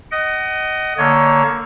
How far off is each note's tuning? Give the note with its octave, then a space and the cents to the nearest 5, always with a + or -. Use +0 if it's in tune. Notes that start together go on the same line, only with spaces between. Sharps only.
D#5 +0 F#5 +35
D3 +0 A#3 +0 C#5 +10